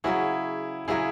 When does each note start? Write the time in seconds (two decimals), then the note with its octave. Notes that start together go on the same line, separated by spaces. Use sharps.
0.04 C#3 F#3 C#4 E4 F#4 G#4
0.88 C#3 F#3 C#4 E4 F#4 G#4